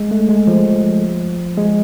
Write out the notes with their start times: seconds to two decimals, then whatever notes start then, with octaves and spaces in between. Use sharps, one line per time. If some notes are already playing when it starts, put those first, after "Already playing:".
Already playing: G#3
0.11 A3
0.29 G#3
0.47 F3
1.57 G#3